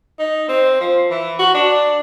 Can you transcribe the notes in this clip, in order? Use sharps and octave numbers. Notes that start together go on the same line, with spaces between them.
D#4
C4
F3
E3
F#4
D4